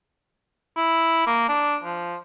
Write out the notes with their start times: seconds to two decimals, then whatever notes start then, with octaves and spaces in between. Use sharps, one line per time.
0.76 E4
1.27 A#3
1.49 D4
1.84 F3